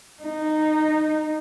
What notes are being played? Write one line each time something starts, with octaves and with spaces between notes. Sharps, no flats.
D#4